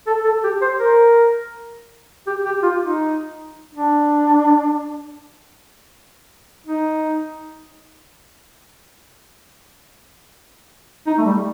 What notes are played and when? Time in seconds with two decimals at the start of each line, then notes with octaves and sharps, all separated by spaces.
0.07 A4
0.24 A4
0.43 G4
0.62 C5
0.79 A#4
2.27 G4
2.45 G4
2.63 F4
2.82 D#4
3.74 D4
6.67 D#4
11.06 D#4
11.18 A3
11.25 G3